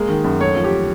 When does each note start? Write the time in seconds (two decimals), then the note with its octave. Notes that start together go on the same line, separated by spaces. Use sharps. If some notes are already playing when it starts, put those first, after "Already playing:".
Already playing: G#3 A#3
0.09 D#3
0.24 F#2
0.40 A3 C#5
0.56 F3
0.64 G4